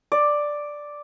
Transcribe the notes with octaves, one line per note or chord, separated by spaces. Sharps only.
D5